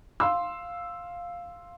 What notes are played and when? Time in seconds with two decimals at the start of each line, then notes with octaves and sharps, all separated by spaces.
0.20 F5 C6 E6